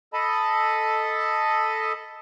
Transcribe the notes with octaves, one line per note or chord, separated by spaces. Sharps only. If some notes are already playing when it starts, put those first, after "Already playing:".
A4 D#5 A5 B5